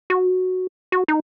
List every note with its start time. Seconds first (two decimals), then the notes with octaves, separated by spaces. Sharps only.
0.10 F#4
0.92 F#4
1.08 D#4